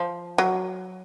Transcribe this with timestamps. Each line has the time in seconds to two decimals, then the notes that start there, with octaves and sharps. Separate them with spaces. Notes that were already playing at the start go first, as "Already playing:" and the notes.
Already playing: F3
0.38 F#3